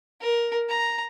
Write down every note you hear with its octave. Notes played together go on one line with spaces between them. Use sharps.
A#4
A#5